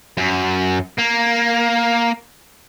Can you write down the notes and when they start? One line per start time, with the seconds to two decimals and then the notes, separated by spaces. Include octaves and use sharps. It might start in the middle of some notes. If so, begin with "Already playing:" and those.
0.17 F#2
0.98 A#3